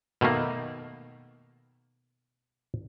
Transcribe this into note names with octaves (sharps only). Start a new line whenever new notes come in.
B2 D#3 A3 A#3